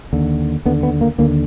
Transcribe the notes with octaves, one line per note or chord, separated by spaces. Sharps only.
D#2 D3
D#2 D3 B3
B3
A#3
D#2 D3 A#3